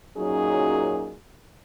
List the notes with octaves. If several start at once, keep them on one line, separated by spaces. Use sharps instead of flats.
F#2 A#2 F#3 C#4 D#4 G#4